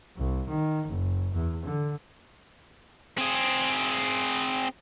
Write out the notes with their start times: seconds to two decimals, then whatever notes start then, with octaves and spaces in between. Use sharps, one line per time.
0.17 C2
0.49 D#3
0.88 F#1
1.34 E2
1.65 D3
3.18 C4 G#4